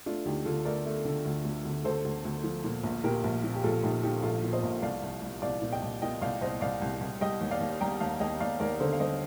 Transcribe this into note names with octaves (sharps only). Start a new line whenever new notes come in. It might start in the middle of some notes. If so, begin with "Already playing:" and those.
A3 D4 F4
D2 D#4 G4
D3 F4 A4
A3 A#4 D5
A3
D3
D2
D2
D2
D2 A4 C5
D2
D2
F3
A#2
A#1
A#2 G4 A#4
A#1
A#2
G4
A#1 F4 A4
A#1 D#4 G4
F3 D#4 G4
A#1 F4 A4
A#2
C5 D#5
A#1
C2 D5 F5
C2
G3
C2 D5 F5
A#2
D#5 G5
C2
A#2 D#5 G5
C2 D5 F5
C2 C5 D#5
C2 D5 F5
C2
C2
G3 D#5 G5
D#2
D5 F5
D#2
G3 G5 A#5
D#2 F5 A5
D#2 D#5 G5
D#2 D5 F5
D#2 A#4 D5
D3 A4 C5
F5
G3 C5 D#5